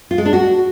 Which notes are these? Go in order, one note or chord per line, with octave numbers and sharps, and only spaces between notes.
F4
G#3
D4
F#4